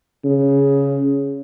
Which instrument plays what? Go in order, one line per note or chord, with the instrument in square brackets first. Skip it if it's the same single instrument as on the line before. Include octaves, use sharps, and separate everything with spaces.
[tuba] C#3